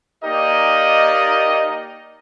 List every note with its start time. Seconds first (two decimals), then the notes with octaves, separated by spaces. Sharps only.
0.24 A#3 D#4 G4 A#4 D5 D#5